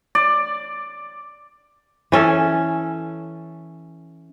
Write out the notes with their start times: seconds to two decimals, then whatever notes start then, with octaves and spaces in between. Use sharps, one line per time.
0.15 D5
2.12 E3 C#4 A4